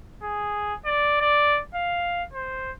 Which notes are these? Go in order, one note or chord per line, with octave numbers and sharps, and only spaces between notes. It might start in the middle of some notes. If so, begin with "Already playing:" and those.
G#4
D5
D5
F5
C5